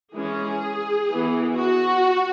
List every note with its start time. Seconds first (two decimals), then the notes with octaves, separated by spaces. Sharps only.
0.14 E3 G#3 C#4 G#4
1.09 E3 B3
1.56 F#4